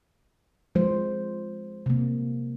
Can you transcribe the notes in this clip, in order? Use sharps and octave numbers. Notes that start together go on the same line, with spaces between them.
F3 G#3 C5
C3 A#3